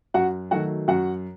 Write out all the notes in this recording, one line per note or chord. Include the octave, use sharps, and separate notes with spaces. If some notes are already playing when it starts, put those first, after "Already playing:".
F#2 F#4 F#5
D#3 F#3 A3 F#4 F#5
F#2 F#4 F#5